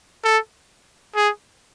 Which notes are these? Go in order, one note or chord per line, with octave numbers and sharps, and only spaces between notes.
A4
G#4